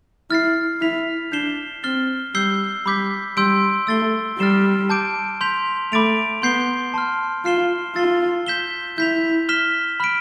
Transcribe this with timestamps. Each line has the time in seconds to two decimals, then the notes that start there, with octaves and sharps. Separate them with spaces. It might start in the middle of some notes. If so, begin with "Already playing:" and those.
0.30 E4 F6 A6 C7
0.81 E4 F6 B6 F7
1.32 D4 G6 C7 E7 G7
1.84 C4 F6 A6 C7 G7
2.35 G3 E6 G6 C7 G7
2.85 G3 B5 D6 G6 B6
3.37 G3 C6 E6 G6 D7
3.87 A3 E6 A6 C7 G7
4.39 G3 F6 A6 C7 E7 G7
4.90 A5 D6 G6 D7
5.41 C6 G6 B6 F7
5.92 A3 B5 D6 A6 D7 F7
6.42 B3 C6 G6 C7 G7
6.94 A5 C6 F6
7.45 F4 F6 C7 E7 G7
7.95 F4 E6 A6 C7 G7
8.47 G6 B6 E7 G7
8.98 E4 G6 B6 F7
9.49 F6 B6 E7 G7
10.00 B5 F6 B6 D7